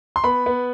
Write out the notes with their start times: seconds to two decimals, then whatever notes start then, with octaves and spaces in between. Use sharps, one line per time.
0.16 C6
0.24 B3 B5
0.46 B3